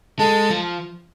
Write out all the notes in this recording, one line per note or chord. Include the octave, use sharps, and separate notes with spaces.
G#3 A4
F3